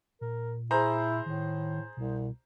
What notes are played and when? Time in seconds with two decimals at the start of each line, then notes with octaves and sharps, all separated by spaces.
0.21 A#2 A#4
0.71 E4 G#4 C5 A#5
1.26 A2 D#3
1.97 C2 B2